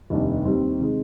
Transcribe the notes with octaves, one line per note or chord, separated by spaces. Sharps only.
F1 D#2 D#3 G3 D4
D#2 D#3 G3 C4 G4
C3 D#3 G#3 D#4